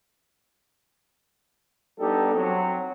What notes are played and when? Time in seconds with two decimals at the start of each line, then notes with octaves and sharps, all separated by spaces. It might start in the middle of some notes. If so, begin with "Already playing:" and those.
1.99 G3 B3 D4 D#4 G4 A4
2.34 F#3 C4